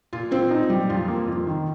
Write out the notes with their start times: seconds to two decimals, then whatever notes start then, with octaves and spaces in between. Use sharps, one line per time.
0.13 A#2 F4
0.31 C4 F4
0.51 A#2 D#4
0.70 G3
0.89 F2 F4
1.08 A#3
1.27 F2
1.47 D#3